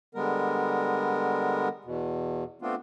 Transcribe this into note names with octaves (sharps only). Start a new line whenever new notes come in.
D3 G3 G#3 B3 A#4
E2 B2
A3 B3 C4 D4 F4